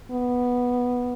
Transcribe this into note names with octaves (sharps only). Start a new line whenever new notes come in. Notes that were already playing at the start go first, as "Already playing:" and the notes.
B3